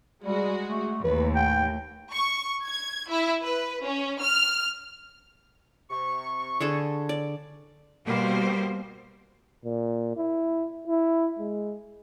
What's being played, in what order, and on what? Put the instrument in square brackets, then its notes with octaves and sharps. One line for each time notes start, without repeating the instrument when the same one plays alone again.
[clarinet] G3 [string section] G#3 F#4
[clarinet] A3
[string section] D#2 A2 [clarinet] B4
[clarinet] G5
[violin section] C#6
G#6
E4
B4
C#4
F6
[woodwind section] C3 C#6
[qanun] D3 G#4 A4
D5
[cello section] B2 G3 A#3 C5
[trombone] A#2
E4
E4
G#3